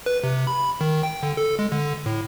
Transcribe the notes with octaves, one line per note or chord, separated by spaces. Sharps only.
B4
C3
B5
D#3
G5
D3
A4
G#3
D3
A2